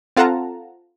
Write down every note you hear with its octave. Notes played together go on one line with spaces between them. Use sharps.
C4 F4 A4 F#5 A5 A#5